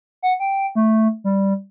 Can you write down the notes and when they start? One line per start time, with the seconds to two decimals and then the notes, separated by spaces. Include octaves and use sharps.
0.23 F#5
0.40 G5
0.75 A3
1.24 G3